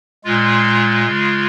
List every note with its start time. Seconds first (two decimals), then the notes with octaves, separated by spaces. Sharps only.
0.24 A#2 G#3 F4
1.07 C#3 G#3